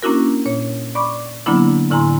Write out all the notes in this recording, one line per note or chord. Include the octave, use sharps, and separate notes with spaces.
A#3 C#4 D4 E4 F#4 A#4
A#2 C#5
D5 B5 C#6 D6
D3 F#3 A#3 B3 D4 E4
A2 D3 E4 G#5 A#5 C6